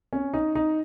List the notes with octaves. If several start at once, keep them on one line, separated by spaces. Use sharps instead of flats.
C#4
D#4
D#4